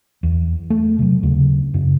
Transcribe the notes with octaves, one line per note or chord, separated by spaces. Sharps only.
E2
A3
C3 F#3
D#2 C#3
F#2 C#3